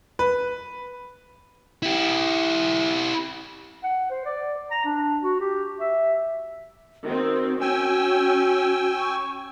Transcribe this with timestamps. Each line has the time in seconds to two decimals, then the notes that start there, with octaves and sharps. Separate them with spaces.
0.19 B4
1.83 E4 G4
3.84 F#5
4.10 C5
4.25 D5
4.71 A#5
4.85 D4
5.23 F#4
5.41 G4
5.80 E5
7.04 D#3 C4 F#4
7.61 C#4 G5 G#5 E6
8.94 C#6